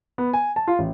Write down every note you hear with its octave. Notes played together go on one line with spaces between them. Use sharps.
B3
G#5
A5
F4
A1